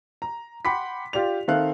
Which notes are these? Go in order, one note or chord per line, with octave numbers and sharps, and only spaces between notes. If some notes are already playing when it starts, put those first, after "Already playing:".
A#5
F#5 G5 B5 C6 D6 B6
F4 G4 D5 F7
D#3 C4 A4 E5 F5 F#6